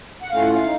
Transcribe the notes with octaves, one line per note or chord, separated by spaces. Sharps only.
F#5
A2 A3 C#4 F4 F5
F#5
F5
D#4